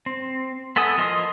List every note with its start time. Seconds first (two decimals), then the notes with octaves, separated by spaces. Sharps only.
0.06 C4
0.76 B3 E4 A4 G#5 D#6
0.98 F3 A#4 D#5 C6 D#6